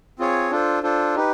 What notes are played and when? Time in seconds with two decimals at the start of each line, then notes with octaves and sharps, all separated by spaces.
0.19 C4 F4 G#4 C#5
0.51 D4 F4 A4 C5
0.83 D4 F4 A4 C5
1.15 D#4 G4 B4